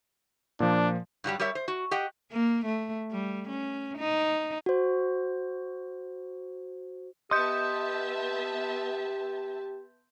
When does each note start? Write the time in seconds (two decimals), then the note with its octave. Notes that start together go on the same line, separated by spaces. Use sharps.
0.60 A#2 F3 D4
1.24 G2 F#3 G3 G4
1.40 G3 G4 A#4 C#5 E5
1.55 C5
1.68 F#4
1.91 G4 D#5 F#5 G5
2.32 A#3
2.66 A3
3.12 G3
3.49 C#4
3.98 D#4
4.66 F#4 C5
7.31 B3 G4 D#5 E5 A5 C6 G6